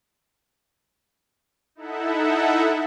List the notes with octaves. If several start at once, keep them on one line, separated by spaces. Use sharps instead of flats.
D#4 E4 A4 E5 F#5